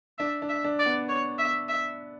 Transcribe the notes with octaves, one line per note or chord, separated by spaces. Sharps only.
D4 E5
D4
E5
D4
D5
B3
C#5
E5
E5